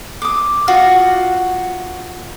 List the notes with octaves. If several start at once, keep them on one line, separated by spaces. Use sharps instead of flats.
D6 D#6
F4 F#4